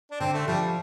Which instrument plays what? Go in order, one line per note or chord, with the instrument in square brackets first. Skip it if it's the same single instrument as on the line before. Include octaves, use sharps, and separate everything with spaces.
[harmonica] D4
[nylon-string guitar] D3 [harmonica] C4
[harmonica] A3
[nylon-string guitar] F3 [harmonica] G3